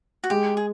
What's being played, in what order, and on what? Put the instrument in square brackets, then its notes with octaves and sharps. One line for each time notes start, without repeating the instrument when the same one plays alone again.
[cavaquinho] F#4
[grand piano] G#3 [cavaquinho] G4
[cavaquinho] G#4